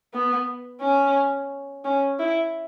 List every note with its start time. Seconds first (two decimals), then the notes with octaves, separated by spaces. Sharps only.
0.14 B3
0.81 C#4
1.85 C#4
2.19 E4